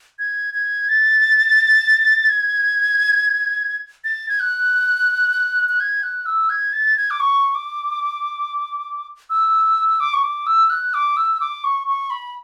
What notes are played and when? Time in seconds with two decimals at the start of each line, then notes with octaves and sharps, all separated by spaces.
0.19 G#6
0.54 G#6
0.89 A6
2.29 G#6
4.04 A6
4.29 G#6
4.40 F#6
5.69 F#6
5.80 G#6
6.03 F#6
6.26 E6
6.50 G#6
6.73 A6
6.97 G#6
7.10 D6
7.20 C#6
7.55 D6
9.30 E6
10.00 D6
10.14 C#6
10.23 D6
10.47 E6
10.70 F#6
10.94 D6
11.17 E6
11.40 D6
11.64 C#6
11.87 C#6
12.10 B5